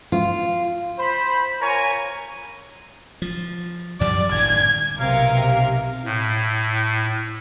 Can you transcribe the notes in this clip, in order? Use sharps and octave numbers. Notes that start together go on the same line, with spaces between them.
F4
C5 B5
F4 A#4 C#5 G#5 A#5 C#6
F3
F#2 F3 G3 D5
G1 A2 D#3 G#6
B1 C3 A#4 F5
A2